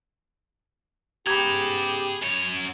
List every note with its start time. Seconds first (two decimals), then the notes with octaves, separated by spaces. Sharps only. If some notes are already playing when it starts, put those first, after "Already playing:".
1.27 C#3 B3 G4 G#4 A#5 B5 G#6
2.22 F#2 C#5